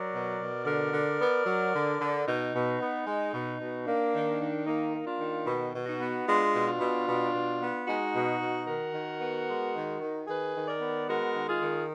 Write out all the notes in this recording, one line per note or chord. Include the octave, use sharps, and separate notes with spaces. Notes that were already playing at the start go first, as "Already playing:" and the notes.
Already playing: F#3 A#4 D5
B2
B2
D3 A#4 D5
D3
B3
F#3
D3
D3
B2 D#4
B2
B3
G#3
B2
B2
A#3 D4
D#3
D#3
A#3 D#4
A#3
D4 F4
D#3
B2
B2
D#4 F#4
B3
G#3 D4 F4
B2
D4 F4
B2
B2
B2
B3
G#3 D#4 F#4
B2
B2
D#3 F#4 A#4
D#3
B3
G#3
D#3
D#3
D#3 G#4 B4
D#3
A#4 D5
B3
G#3 F#4 A#4
D#3
F4 G#4
D#3